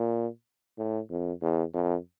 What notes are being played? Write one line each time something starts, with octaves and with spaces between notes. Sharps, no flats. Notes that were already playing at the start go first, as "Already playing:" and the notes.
Already playing: A#2
A2
F2
E2
F2